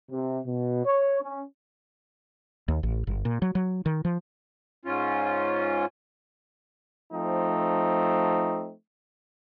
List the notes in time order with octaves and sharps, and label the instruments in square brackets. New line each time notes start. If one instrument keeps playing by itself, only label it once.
[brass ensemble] C3
B2
C#5
C#4
[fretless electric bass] D#2
A1
G1
A#2
F#3
F#3
D#3
F3
[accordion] G#2 C#4 F4
[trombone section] F3 A3 C4 D#4